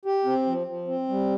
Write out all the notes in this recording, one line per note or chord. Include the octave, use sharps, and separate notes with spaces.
G4
C4
F3
F3
C4
G3